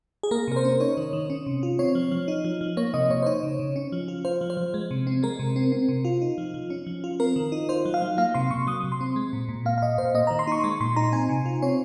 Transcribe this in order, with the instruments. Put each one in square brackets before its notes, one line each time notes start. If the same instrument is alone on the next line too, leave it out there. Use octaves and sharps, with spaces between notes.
[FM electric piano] G#4
A#3 A#4
C3 A#4
C5
C#4
D#4 C#5
D#3
D#3
C#4
C3
F4
C4 C#5
F3
F3
D#4
F3
F3
A#3 C#5
C3 D#5
C3 C#5
C5
D#4 C#5
C#3
C#3
C#4
F3
F4
F4 C5
F3
C5
F3
G#3
C3
C4
G#3 A#4
C3
C4
C4
C3
F4
D#4
F3
F3
C#4
F3
F4
C4 A#4
D#3
D#4
F4 C5
F#3
F5
F#3
A#3 F5
C3 C6
C3 C#6
F#3 D#6
C3
C6
C4
G#3
A#2
A#2
A#3 F5
F5
A#2 D#5
A#2 C5
A#3 D#5
A#5
D#3
C6
D#4 C#6
G#3 C#6
A#2 C6
D#4 A#5
C4 G#5
C3
F4
C4 C#5